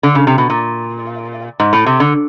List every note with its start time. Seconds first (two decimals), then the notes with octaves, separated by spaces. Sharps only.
0.03 D3
0.15 C#3
0.27 C3
0.38 B2
0.50 A#2
1.60 G#2
1.73 A2
1.86 C3
2.00 D3